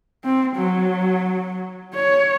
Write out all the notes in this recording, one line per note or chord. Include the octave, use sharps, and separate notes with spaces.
C4
F#3
C#5